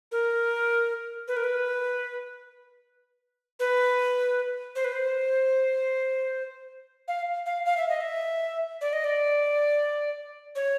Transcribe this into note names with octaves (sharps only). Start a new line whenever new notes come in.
A#4
B4
A#4
B4
B4
C5
B4
C5
F5
F5
F5
E5
D#5
E5
D5
D#5
D5
C#5